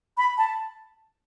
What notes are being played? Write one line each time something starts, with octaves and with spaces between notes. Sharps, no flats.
B5
A5